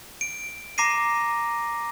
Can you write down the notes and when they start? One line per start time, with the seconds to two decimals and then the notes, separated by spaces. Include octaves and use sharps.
0.21 D7
0.78 A#5 D6 A#6 C7 D#7